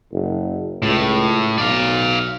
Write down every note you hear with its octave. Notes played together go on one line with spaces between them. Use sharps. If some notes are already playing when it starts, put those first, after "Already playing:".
F#1
C#2 A2
B1 D5 F5